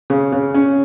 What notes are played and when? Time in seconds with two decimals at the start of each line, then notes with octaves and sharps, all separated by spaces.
0.10 C#3
0.32 C#3
0.55 C#4